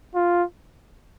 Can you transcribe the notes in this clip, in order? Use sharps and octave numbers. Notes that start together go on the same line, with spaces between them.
F4